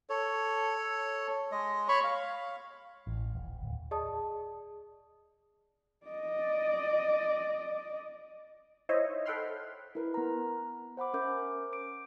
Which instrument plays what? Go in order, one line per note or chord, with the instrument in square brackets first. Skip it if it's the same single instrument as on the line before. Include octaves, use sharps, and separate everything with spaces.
[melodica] A4 C#5
G#3 D#5
C#5 B5 C#6
F5
[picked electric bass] A1
D#1
D1
[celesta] G#4 D5 D#5 A5 D#6
[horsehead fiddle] D5 D#5
[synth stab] D#4 E4 C5 C#5 D#5 E5
A4 F#5 G5 B5 C6 F6
[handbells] E4 A#4 B4
B3 A#5
C5 F#5 B5 D6
C#4 A#4 E5 D6 G6
D6 D7